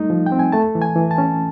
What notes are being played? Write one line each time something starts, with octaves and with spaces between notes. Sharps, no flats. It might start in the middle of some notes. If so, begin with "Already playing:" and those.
Already playing: G3 A3 D#4
F3
G5
C4
G#5
A3 A5
E3
G#5
E3
A5
C#4